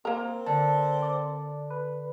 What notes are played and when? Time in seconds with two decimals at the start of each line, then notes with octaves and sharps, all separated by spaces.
0.05 A#3 C4 A#4
0.46 D3 A5
1.02 D5
1.70 B4